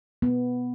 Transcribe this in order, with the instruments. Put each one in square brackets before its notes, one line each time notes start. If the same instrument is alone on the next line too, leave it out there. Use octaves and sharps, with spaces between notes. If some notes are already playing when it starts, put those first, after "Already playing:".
[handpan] B3